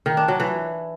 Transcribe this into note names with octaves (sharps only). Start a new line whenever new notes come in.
D#3
D4
F#3
E3